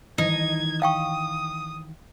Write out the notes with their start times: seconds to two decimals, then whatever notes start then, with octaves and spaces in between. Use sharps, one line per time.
0.18 D#3 E3 D#4 G#6
0.82 F5 G5 C#6 D#6